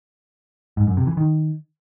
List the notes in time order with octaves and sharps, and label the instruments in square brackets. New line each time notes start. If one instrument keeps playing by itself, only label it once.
[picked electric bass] G#2
F#2
C3
E3
D#3